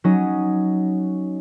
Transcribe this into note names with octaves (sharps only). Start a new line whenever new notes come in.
F#3 C#4 D#4 D#5